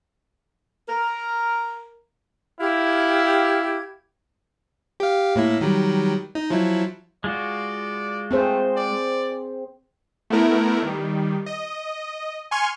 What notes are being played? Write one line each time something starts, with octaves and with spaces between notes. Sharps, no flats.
A#4
E4 G4 F5 G#6
G4 F5
A2 A#3 E4
D#3 F#3 G3
D#4
F3 F#3 E4
G#3 F4 F#4 D5
A3 C4 G#4 C5
D5
A3 B3 E4 A#4
D#3 G3
D#5
G#5 C6 C#6 F6 G#6